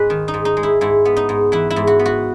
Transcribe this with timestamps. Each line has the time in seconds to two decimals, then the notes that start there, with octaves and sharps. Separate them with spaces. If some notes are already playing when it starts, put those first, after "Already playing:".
Already playing: G#2 G#3 B4
0.10 D#3
0.28 D#4
0.34 G#2
0.45 D#4
0.57 G#3
0.63 E4
0.81 G#2 E4
1.05 B3
1.17 D#4
1.29 G#2
1.52 E3 E4
1.70 E4
1.76 G#2
1.87 F#4
1.99 B3
2.06 F#4